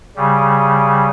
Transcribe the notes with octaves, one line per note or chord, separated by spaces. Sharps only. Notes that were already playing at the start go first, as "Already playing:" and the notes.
C#3 G3